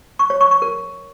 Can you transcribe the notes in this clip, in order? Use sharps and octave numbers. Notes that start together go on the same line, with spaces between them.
C#6
C#5
C#6
C#6
A#4